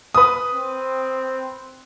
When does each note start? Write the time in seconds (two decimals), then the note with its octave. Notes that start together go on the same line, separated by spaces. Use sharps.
0.15 B4 D#6
0.55 C4